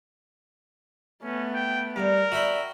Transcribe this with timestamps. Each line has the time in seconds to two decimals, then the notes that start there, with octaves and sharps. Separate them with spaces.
1.22 A3 B3 C#4
1.54 G5
1.96 G2 D#3 A#4 D5 F5
2.32 D3 G3 B3 F#4 E5 G5 B5